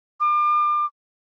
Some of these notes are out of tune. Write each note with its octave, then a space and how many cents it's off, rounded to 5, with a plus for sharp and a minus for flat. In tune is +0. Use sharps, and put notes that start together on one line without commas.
D6 +35